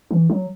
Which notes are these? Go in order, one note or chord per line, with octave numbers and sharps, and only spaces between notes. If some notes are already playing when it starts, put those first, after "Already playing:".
E3
F#3